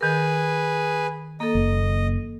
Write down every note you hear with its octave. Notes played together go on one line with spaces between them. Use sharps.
D#3 G#4 A#4 B4
A#3 A4 D#5
F#1